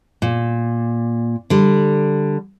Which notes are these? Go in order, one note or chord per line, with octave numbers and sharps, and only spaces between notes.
A#2
D3 G3